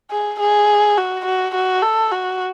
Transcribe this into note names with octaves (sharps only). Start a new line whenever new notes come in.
G#4
G#4
F#4
F#4
F#4
A4
F#4